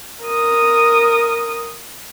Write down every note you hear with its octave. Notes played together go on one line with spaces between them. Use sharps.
A#4 D#6